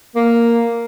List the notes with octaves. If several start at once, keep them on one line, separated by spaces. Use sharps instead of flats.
A#3